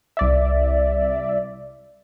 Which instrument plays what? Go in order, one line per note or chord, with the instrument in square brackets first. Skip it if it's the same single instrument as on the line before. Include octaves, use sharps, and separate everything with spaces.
[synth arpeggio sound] C2 D5 E5